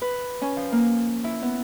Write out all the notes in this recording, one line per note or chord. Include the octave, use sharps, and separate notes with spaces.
B4
C#4
F3
A#3
E4
B3